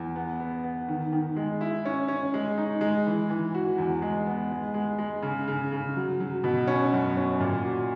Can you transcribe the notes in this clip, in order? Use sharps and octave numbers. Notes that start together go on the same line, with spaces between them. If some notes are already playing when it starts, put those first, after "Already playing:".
Already playing: E2
B3
B3
B3
D#3
D#3
G#3
E4
C#4
C#4
G#3
D#4
G#3
E3
E3
F#4
E2
G#3
B3
G#3
G#3
G#3
C#3
C#3
C#3
F#3
F#3
B2
C#4
F#2
C#4
A#2
F#4